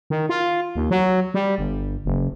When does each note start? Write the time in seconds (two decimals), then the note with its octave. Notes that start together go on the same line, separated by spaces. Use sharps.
0.10 D#3
0.29 F4
0.76 D#2
0.91 F#3
1.34 G3
1.58 G1
2.05 F#1